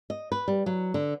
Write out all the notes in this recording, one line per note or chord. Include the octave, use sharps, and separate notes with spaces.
D#5
B4
G3
F#3
D3